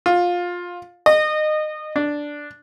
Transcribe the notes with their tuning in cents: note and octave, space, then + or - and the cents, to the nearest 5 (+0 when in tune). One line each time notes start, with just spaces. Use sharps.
F4 +15
D#5 -25
D4 +0